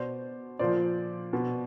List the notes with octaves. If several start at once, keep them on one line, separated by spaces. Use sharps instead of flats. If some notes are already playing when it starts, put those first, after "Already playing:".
Already playing: B2 C5 D5
A#2 F3 C5 D5
B2